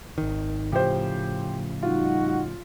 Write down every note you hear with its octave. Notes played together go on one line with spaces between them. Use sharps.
G#1 D#3
A2 C#3 F3 G4 C5
G3 D#4 F4 F#4